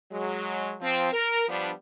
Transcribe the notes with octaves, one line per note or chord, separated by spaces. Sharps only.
F#3 G#3
F3 C4
A#4
F3 G3 B3 D4